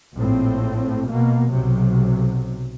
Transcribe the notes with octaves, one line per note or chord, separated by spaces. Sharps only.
A#1 A2 C4
B2 A#3
B1 C3 F#3